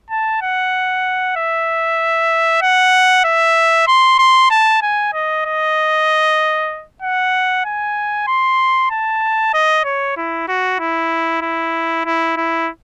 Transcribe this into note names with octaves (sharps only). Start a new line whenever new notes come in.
A5
F#5
E5
F#5
E5
C6
C6
A5
G#5
D#5
D#5
F#5
G#5
C6
A5
D#5
C#5
E4
F#4
E4
E4
E4
E4